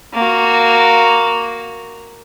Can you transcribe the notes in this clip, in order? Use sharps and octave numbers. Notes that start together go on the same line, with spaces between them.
A#3 F#4